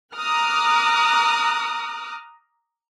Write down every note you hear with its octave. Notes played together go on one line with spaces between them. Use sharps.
A#5 D6 D#6 F6 F#6